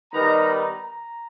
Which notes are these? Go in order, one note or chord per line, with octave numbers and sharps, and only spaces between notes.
D#3 G3 B3 D#4 A#5
A#5
A#5